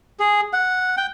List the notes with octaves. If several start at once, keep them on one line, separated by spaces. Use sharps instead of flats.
G#4
F#5
G5